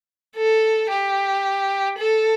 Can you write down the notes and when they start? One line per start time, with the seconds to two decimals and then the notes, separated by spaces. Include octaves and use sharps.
0.36 A4
0.90 G4
1.99 A4